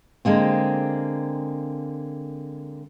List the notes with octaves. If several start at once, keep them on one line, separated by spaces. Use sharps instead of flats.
D3 G#3 A#3 C4